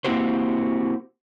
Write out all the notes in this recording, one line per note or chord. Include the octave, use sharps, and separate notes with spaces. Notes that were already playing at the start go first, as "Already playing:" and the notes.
A#3 C4 E4 F#4 G4 C5